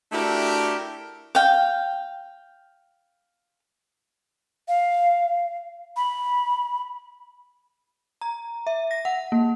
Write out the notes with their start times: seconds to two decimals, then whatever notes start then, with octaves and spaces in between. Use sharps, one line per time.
0.12 A3 D4 E4 F#4 G4 A#4
1.35 F5 G5
4.68 F5
5.96 B5
8.21 A#5
8.67 E5
8.91 A#6
9.05 F#5
9.32 A#3